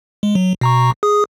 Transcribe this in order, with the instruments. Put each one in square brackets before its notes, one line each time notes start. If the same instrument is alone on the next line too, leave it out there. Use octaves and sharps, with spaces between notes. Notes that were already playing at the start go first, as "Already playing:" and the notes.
[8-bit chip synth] G#3
F#3
B2 A#5 C#6
G#4 D#6